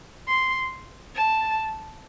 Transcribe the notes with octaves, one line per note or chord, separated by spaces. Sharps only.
C6
A5